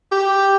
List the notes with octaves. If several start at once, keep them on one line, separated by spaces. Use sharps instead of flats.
G4